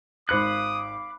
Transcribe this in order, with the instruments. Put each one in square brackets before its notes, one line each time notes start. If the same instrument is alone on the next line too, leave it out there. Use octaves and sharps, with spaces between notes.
[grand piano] G#1 C5 C#7 [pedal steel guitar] F5 B5 F#6 [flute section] D6 [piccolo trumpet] D#6